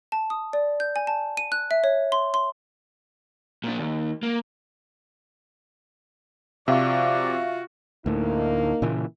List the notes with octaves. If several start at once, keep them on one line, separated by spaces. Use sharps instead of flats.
A5
D#6
D5
G6
G#5
A5
D#7
F#6
E5
C#5
C6
C6
A#2 D4
D#2
A#3
C3 F3 F4 F#4 D5 E5 F5 C#6
D2 A2 A#3 D#4
A#2 C#3 E3